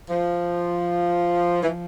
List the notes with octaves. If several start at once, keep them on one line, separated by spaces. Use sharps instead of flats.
F3
E3
F3